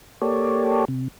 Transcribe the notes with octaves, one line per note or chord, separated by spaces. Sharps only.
A#3 G4 A4 C#5 D5
C3